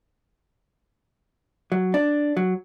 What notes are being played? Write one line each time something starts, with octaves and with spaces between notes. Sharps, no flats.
F#3
D4
F#3